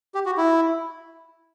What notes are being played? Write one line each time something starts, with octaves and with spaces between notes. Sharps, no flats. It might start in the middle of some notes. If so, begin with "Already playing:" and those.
G4
F#4
E4